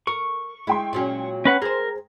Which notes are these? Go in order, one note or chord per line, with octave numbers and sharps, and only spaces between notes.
A#4 C#6
G#3 E4 G5 C6
A#2 F#3 C#4
C#4 B4 F#5
G#4 A#4 C5